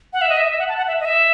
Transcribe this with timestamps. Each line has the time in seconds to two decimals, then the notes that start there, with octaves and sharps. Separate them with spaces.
0.13 F#5
0.21 E5
0.29 D#5
0.37 E5
0.45 D#5
0.50 E5
0.59 F#5
0.69 A5
0.77 F#5
0.87 E5
1.00 D#5
1.05 E5